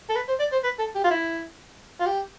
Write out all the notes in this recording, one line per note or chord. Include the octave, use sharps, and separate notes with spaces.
A4
B4
C5
D5
C5
B4
A4
G4
F4
E4
F4
G4